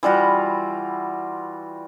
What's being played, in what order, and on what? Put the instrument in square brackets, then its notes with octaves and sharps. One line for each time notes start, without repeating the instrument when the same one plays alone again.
[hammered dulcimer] E3 G3 F4 F#4